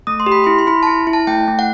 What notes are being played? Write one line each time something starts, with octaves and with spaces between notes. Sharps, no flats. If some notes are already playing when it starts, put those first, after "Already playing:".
A3 D#6
C6
G4
B5
E4 C6
C6
E4 B5
E4 A5
E4
A5
A3 G5
A3
F#5